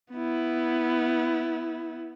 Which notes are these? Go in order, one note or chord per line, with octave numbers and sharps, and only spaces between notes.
B3 E4